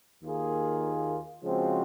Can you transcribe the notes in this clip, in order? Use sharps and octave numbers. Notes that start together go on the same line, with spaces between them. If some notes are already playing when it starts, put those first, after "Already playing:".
D#2 D#3 A#3 F4 G#4
C#3 F3 G#3 C4 F#4